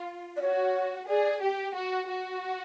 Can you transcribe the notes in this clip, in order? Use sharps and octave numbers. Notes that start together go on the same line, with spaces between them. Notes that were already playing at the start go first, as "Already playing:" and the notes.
Already playing: F4
D5
F#4 C#5
G#4 D5
G4
F#4
F#4